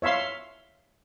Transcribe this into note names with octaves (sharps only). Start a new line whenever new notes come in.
C#5 E5 F5 C6